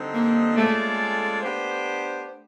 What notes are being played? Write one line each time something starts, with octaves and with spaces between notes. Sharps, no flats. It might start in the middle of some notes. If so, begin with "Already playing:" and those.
Already playing: D3 G3 C4 D#4
A#3
G#3 A3 C#4 F4 A4 D5
B3 D4 G4 C5